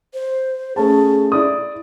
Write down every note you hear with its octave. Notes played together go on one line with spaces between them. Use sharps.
C5
A3 C#4 G#4 A5
E4 D5 D#6